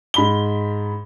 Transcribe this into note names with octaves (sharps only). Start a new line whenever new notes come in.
G#2 B5 G7